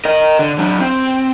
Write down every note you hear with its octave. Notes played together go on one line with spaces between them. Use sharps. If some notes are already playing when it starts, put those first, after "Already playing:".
A#4 D#5
D3
F#3 D4
C4